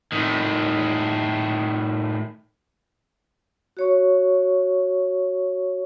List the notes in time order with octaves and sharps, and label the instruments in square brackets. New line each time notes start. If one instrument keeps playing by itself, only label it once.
[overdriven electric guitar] A2 D#3
[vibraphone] F#4 C#5 C#6